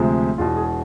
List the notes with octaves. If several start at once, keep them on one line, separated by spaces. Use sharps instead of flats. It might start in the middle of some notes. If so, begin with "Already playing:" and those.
Already playing: D2 C3 F3 G#3
E1 E2 B2 F4
G#4